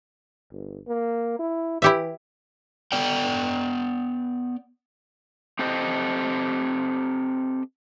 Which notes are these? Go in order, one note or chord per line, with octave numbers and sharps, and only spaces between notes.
G1
A#3
E4
E3 E4 G4 E5
B3 D5 G5
C4 G4 A4 C5 D#5